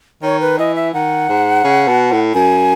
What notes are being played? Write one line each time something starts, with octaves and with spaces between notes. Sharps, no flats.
D#3 C#5
B4
E3 D#5
E5
D#3 F#5
G#2
C#3
B2
A2
F#2 G#5